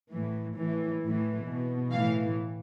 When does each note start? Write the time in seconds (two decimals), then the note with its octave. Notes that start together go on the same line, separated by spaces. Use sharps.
0.13 A2 E3
0.57 A2 E3
1.02 A2 E3
1.46 B2
1.91 A2 E3 F5